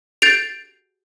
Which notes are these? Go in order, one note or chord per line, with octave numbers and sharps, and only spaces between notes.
G6 A6 C7 D7 F7